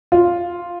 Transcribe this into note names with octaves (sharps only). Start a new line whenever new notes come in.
F4